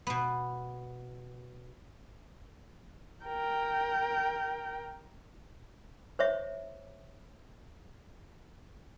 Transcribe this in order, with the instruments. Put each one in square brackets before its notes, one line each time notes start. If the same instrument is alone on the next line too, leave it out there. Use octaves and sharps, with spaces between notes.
[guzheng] B2 B3
[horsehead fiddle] A#4 G5
[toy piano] C5 C#5 E5